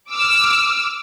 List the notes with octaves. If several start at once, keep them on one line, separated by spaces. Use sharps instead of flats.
D6 E6 F6